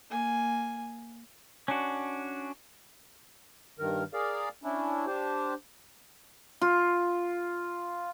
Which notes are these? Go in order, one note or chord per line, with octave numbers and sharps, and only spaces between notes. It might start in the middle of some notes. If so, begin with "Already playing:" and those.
A#3 G#5
C#4 D4 F#4
G2 D#3 A#4
G#4 A#4 D5 F5
C#4 D4 E4
D4 G4 C5
F4